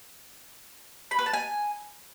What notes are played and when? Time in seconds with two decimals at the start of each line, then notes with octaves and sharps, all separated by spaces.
1.11 B5
1.19 B4
1.26 A5
1.33 G#5